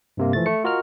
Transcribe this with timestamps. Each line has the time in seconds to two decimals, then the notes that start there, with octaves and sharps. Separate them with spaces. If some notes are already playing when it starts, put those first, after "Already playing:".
0.17 G2 C3 A#3
0.33 E3 F3 A3 A6
0.46 A3 C#7
0.64 F4 F#4 A#4 D#5 F6